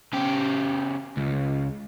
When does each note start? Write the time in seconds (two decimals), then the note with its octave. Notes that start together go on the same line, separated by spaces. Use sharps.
0.13 C#3 G4
1.17 C#2